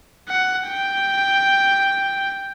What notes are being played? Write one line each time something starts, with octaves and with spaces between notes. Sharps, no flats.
F#5
G5